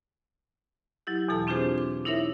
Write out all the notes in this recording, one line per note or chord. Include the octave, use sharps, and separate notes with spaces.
F#3 E4 G4
E2 B2 E3 A4 A5
C4 D4 F4 G4 G#4 C5
D6
D#4 E4 A#4 C#5 E5